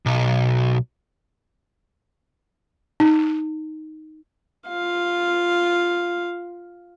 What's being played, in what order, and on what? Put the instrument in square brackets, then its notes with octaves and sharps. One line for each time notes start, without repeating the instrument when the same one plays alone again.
[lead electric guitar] B1
[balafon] D#4
[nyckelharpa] F4 F5